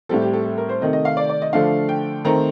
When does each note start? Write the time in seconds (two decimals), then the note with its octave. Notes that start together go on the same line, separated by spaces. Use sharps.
0.09 A2 G3 C4 A4
0.22 G4
0.33 A4
0.46 A4
0.58 A#4
0.69 C5
0.81 C3 D#3 A3 D#5
0.93 D#5
1.05 F5
1.17 D5
1.30 D5
1.42 D#5
1.53 D3 F3 A3 D4 F5
1.89 G5
2.25 D#3 A3 C4 A#5